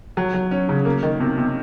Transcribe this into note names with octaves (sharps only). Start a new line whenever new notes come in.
F#3
F#3
C#4
C#3
A#3
D#3
C3
C3